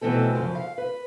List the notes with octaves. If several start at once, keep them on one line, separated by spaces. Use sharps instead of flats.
B2 E3 A3 C4 A4
F#2 C#3 F3
F5
B4